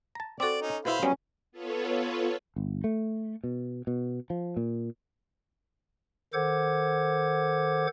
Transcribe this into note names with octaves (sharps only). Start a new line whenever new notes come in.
A5 A#5
C4 F#4 A4 D5 D6
C#4 D#4
B2 B3 E4 C5 F5 B5
F#3 G3 B3 C#4
B3 F4 A4 B4 C#5
G1
A3
B2
B2
F3
A#2
D#3 A4 C5 F#5 D6 G#6